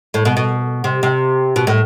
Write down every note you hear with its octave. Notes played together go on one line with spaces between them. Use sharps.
A2
B2
B2
C3
C3
B2
A2